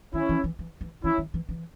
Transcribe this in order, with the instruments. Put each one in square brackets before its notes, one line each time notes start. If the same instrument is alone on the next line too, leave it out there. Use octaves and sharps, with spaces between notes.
[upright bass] D#3 [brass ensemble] C#4 E4
[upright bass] E3
E3
E3
E3
[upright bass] E3 [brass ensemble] C#4 E4
[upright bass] D#3
E3
E3